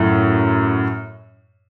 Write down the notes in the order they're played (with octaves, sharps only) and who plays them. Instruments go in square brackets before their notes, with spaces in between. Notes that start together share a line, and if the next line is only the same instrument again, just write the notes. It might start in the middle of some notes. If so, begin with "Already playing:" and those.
Already playing: [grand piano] F#2 A2